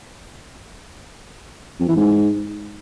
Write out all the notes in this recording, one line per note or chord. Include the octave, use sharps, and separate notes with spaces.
F2
E3
G#2